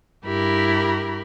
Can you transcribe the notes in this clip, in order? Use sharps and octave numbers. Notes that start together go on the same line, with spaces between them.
G2 E4 G4 A#4 B5